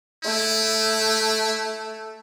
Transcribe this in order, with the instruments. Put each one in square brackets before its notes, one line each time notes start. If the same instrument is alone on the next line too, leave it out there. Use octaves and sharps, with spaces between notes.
[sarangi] A3 [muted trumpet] E4